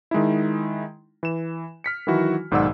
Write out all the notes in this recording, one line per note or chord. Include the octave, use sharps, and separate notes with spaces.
D#3 G#3 D#4 E4
E3 E7
F6 B6 C#7
D#3 E3 F#3 E4 F#4
B1 G#2 D#3 D5 F#5 E6